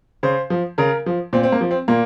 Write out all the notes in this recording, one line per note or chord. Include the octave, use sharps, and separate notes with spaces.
C#3 C5
F3
C#3 A#4
F3
A#2 C4
C4
A#3
F3
C4
A#2 A#3